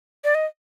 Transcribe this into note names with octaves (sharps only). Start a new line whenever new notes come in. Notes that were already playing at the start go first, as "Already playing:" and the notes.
D5
D#5